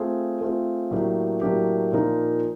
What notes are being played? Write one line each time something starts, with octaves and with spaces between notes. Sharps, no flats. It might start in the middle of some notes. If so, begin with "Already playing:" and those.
Already playing: A3 C4 F4 G#4
A3 C4 F4 G#4
A2 F#3 A#3 D4 G4
A2 F#3 A#3 D4 G4
A#2 F3 A#3 D#4